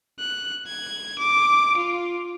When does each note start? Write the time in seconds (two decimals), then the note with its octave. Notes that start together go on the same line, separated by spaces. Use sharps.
0.19 F#6
0.66 G#6
1.19 D6
1.77 F4